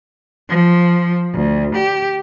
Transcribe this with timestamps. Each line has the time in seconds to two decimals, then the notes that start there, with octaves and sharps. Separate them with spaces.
0.49 F3
1.34 D2
1.76 G4